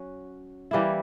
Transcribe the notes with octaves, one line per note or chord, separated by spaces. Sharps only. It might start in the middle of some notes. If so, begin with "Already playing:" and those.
Already playing: F#3 C#4 F#4
E3 G3 A#3 E4